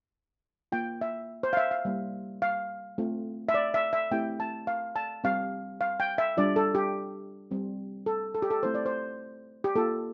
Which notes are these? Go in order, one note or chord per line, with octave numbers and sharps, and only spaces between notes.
A#3 F4 G5
E5
C5
F5
E5
F5
G3 A#3 E4
F5
A3 C4 F4
E5
D5
E5
E5
A3 C4 E4 G4 G5
A5
F5
A5
G3 C4 G4 F5
F5
G5
E5
G3 D4 F4 D5
A4
G4
G3 C4 G4
A4
A4
G4
A4
A3 C4 E4 G4 C5
D5
C5
G4
A#3 F4 A4